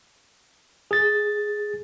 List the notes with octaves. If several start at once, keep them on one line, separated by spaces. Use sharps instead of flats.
G#4 A6